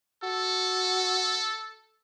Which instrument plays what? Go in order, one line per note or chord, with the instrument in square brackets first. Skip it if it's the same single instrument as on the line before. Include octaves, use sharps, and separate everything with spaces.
[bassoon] F#4 [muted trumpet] A4